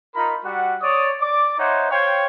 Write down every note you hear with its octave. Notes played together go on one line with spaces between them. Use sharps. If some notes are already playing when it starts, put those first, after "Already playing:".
D#4 F4 A#4 A#5 B5
G3 F#4 F#5
C#5 D5 D#6
D5 D6
D#4 C5 C#5 E5 F#5
C5 C#5 F5 G5